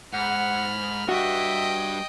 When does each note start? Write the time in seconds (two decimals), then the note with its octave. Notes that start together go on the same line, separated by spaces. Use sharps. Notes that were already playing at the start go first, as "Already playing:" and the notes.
0.13 G#2 F#5 B5 F6
1.09 G3 D4 F#4 D#5 E5 G5